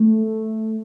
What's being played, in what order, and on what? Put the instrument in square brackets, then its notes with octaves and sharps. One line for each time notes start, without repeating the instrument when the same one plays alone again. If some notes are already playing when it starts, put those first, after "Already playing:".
Already playing: [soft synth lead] A3